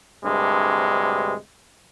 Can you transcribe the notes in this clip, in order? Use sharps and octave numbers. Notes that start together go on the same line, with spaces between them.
D2 G2 C3 G#3